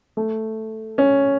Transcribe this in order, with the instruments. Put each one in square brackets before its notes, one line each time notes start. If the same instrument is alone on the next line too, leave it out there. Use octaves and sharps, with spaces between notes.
[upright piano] A3
C#4